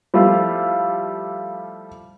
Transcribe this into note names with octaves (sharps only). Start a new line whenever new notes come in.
F3 G3 A3 E4 F4